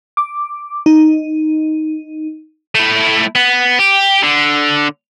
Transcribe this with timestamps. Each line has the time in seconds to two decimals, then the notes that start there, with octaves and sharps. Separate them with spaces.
0.17 D6
0.86 D#4
2.75 A3 E4
3.36 B3
3.79 G4
4.23 D3